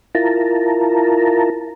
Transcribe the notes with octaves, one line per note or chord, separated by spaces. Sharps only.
E4 F4 A#4 A5 A#5